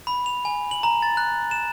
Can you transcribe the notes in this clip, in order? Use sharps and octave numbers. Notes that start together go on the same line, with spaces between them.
B5
F7
G#5
F#7
A#5
A6
F#6
E7